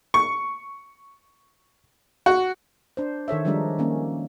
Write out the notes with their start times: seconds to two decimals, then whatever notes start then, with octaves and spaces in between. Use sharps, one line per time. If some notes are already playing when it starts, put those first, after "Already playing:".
0.14 C#6
2.26 F#4
2.97 D4 C5
3.28 D#3 A4 C#5 E5
3.45 D#3 F3 G3 G#3 D4 D#4
3.78 D#3 A#3 C#4